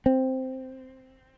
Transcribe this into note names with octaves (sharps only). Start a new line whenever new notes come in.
C4